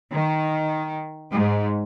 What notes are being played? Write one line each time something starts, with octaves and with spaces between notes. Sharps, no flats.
D#3
G#2